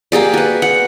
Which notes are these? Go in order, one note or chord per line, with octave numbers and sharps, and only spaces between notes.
A#3 G4 G#4 D5
F#4 B4
F#5